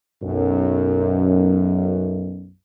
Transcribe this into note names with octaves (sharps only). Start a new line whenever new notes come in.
B1 F#2